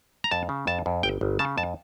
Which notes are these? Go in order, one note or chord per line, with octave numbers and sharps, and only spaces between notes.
A#5
F2 A5
C#3
F2 A5
F2
G1 G5
G1
C#3 A5
F2 A5